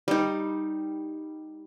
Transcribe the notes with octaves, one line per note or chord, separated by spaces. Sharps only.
G3 D#4